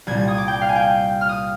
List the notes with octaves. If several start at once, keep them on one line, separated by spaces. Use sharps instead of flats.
C2 A#2 G3 G#6
G#6
D#6
D6
G5
F5
G#5
G5
F6
D#6